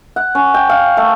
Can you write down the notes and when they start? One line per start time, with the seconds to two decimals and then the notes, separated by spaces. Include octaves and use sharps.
0.16 F#5
0.35 C#4
0.54 G5
0.69 F5
0.97 A3